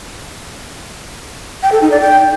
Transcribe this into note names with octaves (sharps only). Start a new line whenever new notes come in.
G5
A4
D#4
D5
G5